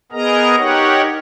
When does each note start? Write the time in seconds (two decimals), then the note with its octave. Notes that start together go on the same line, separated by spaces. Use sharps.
0.12 B3 G#4 A#4 D#5 A#5
0.58 D#4 G4 A#4 C#5 F#5